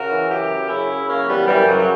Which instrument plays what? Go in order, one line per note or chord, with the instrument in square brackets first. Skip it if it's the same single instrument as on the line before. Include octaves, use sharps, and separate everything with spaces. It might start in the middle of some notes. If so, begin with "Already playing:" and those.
Already playing: [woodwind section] C#3 F#4 A#4
E3
F#2 E4 G4
F#2
C#3 C#4 E4
C#3
F#2 A#3 C#4
E3 G3 B3
F#2 E3 G3
C#3 F#3
F#3